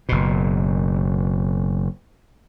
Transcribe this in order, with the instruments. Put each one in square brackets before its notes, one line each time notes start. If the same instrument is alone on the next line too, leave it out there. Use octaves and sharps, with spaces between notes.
[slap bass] F#1 B2